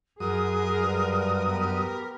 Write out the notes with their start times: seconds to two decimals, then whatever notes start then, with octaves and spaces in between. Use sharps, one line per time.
0.20 F#2 G#4 A#4 D#6
0.80 G2
1.46 B3 G4 A#4